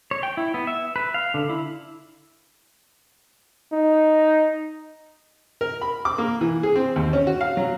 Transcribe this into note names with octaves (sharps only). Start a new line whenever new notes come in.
C#5
G5
E4
B3
E5
B4
F5
D3
E4
D#4
A#4
B5
D6
A#3
E3
G#4
C4
D#2
C#4
F#4
F5
F#3